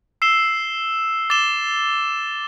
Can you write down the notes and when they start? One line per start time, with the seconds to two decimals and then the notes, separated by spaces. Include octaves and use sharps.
0.22 E6 C7 E7 G7
1.30 D6 A6 E7 G7